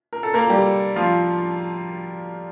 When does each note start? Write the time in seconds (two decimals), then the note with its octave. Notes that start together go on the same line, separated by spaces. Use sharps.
0.13 A#4
0.23 A4
0.34 A#3 A#4
0.50 G3 G4
0.96 F3 F4